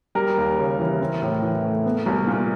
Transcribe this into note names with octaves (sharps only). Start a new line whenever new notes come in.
G3 A#4
D#2
C#3
E3
C4
A2
E3
A3
B3
C2
A#2